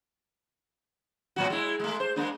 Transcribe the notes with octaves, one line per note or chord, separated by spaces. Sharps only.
A2 F#3 F#4
G#3 E4
G#3 A3
C5
G#3 A#3 D4